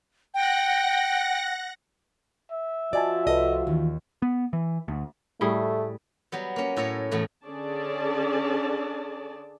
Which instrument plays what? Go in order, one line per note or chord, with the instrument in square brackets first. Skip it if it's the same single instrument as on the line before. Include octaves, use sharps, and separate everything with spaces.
[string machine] F#5 A#6 [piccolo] G5
[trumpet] E5
[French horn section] F3 F4 F#4 [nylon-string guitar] D5 [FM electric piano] D#5 G#5 A5
[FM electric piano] C2 A4 B4 [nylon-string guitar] D#5
[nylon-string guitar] D#2 [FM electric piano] D#3 E3
[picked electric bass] B3
E3
D2
[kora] A2 G3 G#4 [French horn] A3
[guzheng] F#3 G3 B3
A#3 C#4
A2 A4 C#5 A#5
E2 A2 A3
[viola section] D3 C#4 G#4 D5 A5